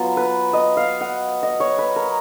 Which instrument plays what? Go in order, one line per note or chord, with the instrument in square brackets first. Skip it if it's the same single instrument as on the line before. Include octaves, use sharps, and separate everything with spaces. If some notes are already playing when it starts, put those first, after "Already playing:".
Already playing: [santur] F#3 B3 F4
B4
D#5
F5
F#5
D#5
C#5
B4
A#4